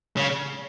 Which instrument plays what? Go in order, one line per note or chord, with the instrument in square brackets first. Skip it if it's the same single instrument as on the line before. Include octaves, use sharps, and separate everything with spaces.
[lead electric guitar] C#3